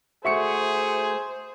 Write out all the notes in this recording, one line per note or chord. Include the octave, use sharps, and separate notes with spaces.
A3 F#4 G#4 C5 E5 C#6 C#7